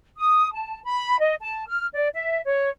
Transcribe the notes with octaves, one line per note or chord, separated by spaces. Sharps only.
D#6
A5
B5
D#5
A5
F6
D5
E5
C#5